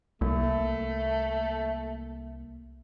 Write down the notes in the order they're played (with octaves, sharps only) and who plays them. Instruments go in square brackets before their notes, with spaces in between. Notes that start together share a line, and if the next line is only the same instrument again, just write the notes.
[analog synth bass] C2 [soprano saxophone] A3 [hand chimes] A#3